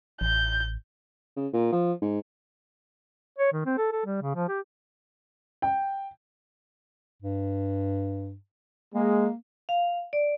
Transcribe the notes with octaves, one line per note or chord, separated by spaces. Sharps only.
A1 G6
C#3
A#2
F3
G#2
C#5
D#3
C4
A4
A4
G3
C#3
F3
G4
G5
G2
G#3 A#3
F5
D5